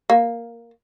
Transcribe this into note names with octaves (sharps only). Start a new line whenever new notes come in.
A#3